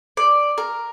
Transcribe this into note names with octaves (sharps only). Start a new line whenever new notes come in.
D5
A#4